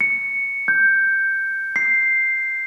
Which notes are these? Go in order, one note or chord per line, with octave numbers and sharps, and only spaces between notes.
C#7
G6
C7